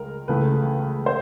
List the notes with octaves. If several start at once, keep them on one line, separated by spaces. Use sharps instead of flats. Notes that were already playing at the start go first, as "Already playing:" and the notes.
Already playing: C#2 G#3 A#4
C#2 C#3 E3 A3 B4
C5